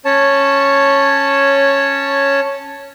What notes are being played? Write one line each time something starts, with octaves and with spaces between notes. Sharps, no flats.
C#4 C#5 A5